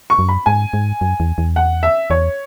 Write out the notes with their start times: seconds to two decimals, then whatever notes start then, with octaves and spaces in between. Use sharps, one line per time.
0.10 C#6
0.19 F#2
0.29 B5
0.46 G#2 G#5
0.73 G#2
1.01 F#2
1.20 E2
1.38 E2
1.56 F#5
1.83 E5
2.10 E2 C#5